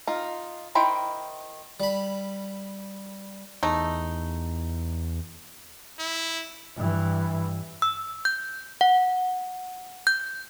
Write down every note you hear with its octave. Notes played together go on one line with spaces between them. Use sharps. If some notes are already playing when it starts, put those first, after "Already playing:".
D#4 F4
D#3 E4 C5 G5
G3 B5
E2 A3 D#4
E4
G2 E3
E6
G6
F#5
G6